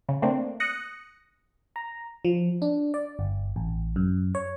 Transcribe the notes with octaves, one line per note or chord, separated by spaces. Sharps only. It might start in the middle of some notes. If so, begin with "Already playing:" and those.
C#3
A3 A#3 C4 D4
D#6 F#6 A#6 C#7
A#5
F3
D4
D5
G1
A1
F#2
C#5